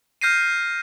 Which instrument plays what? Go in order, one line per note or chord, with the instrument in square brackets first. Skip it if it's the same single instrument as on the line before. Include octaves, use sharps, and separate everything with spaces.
[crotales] F6 G6 A#6 C7 D#7